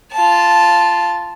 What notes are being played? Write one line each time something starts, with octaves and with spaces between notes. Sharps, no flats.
F4 A5